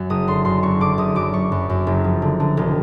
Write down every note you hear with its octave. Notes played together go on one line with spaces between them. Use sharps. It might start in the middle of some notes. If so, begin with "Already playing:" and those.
Already playing: F#2 F#3
F#1 D#6
D3 C6
F#2 C6
F#1 C#6
D3 D6
F#1 D#6
F#2 D6
F#2 C#6
F#2
F#2
F#1
F3
D3
D3
E1